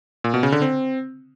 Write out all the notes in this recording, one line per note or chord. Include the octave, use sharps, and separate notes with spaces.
A#2
B2
C#3
D3
C4